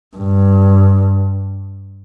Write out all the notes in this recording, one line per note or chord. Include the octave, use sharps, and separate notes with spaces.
G2